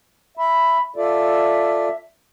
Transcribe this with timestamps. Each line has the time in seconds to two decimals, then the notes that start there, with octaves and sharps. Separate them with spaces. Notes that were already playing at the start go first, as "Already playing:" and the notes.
0.37 E5 B5
0.96 F4 A4 D5 E5